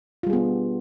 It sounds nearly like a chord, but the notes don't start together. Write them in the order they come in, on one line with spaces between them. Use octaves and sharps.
F4 G3 G#4 B3 D4